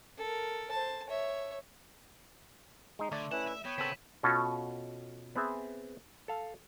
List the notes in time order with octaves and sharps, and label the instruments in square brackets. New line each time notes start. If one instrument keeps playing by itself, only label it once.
[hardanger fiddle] A4 A#4
C5 A5
C#5 E5
[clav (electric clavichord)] G#3 D#4
[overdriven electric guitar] D3 [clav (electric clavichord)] A3 D5
[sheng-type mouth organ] C#4 E4 B4 [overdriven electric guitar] F#5 [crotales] E7
[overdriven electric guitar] E5
[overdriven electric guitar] B3 [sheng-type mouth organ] C#5 G5 B5
[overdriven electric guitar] C#3 [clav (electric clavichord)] B3 C4 A4 [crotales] B6 D#7 F#7
[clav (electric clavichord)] B2 C#4 F4 F#4 A4
B3 C4 G#4 E5
A4 F5